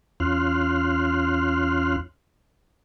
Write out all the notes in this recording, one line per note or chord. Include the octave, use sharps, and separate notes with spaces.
E2 C#4 F4 C6 F6 F#6